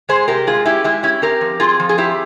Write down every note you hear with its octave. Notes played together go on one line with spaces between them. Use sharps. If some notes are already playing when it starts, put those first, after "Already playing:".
G#3 G#4 C5
C3 G4 A#4
G#3 F4 G#4
C#4 E4 G4
G#3 E4 G4
C#4 E4 G4
C4 G4 A#4
F3
C4 F4 G#4
F3
G#4
C4 E4 G4